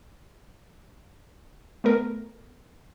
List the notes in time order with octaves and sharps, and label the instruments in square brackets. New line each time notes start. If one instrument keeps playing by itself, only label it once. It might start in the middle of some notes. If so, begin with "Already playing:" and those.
[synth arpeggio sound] A3 B3 A#4